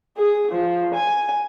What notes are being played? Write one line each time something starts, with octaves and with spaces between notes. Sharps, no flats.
G#4
F3
G#5